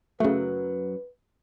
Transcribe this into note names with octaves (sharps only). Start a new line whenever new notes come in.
F#2 C#3 F#3 A3 B4